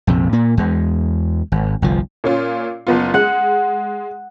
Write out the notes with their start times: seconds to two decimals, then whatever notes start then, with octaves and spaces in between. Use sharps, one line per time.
0.07 A#1 F2 C3
0.33 A#2 A#3
0.57 E2 G#3
1.52 G#1
1.82 G1 C2 F3
2.24 A#2 C#4 F4
2.87 F#1 B3 F4
3.14 G#3 F#5